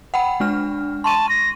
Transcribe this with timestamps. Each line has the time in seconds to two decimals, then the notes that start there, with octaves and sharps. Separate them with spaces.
0.14 F#5 G5 B5
0.40 G#3 D4 F6
1.04 A5 C6 C#6 D#7
1.29 A#6